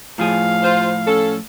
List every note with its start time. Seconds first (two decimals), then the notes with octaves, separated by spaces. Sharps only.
0.18 A2 F3 G#4 F5
0.63 F4 C5
1.07 C#4 A4